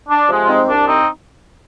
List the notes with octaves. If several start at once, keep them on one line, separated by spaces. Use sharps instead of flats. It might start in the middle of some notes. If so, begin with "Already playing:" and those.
D4
C3 F3 G#3
F4
C4 D#4
C2 D4
C4 D#4